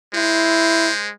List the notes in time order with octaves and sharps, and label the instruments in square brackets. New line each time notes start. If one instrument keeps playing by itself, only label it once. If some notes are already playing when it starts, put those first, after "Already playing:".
[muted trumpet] G#3 [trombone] E4 [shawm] C5